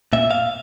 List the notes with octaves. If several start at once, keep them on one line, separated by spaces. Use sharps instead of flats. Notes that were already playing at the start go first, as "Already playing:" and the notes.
A#2 E5
F5